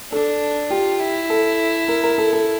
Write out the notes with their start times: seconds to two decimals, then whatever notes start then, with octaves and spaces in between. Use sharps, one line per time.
0.12 D4 A4
0.70 F4 G4
1.00 E4
1.30 A4
1.88 A#4
2.03 A#4
2.18 A4
2.33 A4